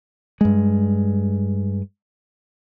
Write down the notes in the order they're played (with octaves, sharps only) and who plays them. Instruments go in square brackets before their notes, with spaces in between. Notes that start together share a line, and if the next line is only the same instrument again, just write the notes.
[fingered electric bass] G2 G#3